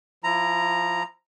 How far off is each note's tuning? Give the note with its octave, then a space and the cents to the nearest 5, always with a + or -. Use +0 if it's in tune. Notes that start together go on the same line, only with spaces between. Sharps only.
F3 +0 E4 +25 A#5 +0